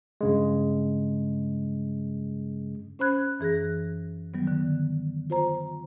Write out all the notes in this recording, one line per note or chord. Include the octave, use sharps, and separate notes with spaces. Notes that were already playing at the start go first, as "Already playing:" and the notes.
G2 C#3 G#3
C#4 C5 B5 F#6 G#6
F#2 E3 G#4 F#6 A#6
D#3 F#3 G3 B3
D3
F4 C5 A#5